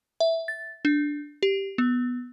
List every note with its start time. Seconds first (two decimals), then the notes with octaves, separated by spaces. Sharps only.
0.20 E5
0.48 A6
0.85 D4
1.43 G4
1.78 B3